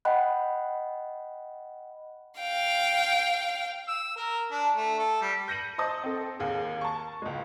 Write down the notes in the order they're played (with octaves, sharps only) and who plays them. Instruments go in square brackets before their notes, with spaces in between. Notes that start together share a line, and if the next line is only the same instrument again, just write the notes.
[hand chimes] D#5 F#5 G5 B5 F#6
[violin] F5 G5
[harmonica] E6
A#4
D4
A3
A4
G3
[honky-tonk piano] G6 A#6 C#7 D#7 F#7
C5 D#5 A5 D#6
C4 A4
D#2 A#3 G#4
A5 C#6
C#2 G#3